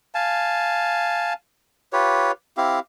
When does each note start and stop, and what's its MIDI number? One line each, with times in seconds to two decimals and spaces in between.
0.15 1.33 77
0.15 1.33 80
0.15 1.33 81
1.93 2.32 65
1.93 2.32 67
1.93 2.32 71
1.93 2.32 73
2.57 2.79 60
2.57 2.79 64
2.57 2.79 67
2.57 2.79 77